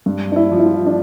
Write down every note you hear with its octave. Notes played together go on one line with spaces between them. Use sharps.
G2
D4
E4
F3
E4
F4
D4